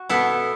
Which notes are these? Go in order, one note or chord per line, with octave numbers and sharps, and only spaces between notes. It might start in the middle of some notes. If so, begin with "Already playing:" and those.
Already playing: F#4
B2 B3 E4 A4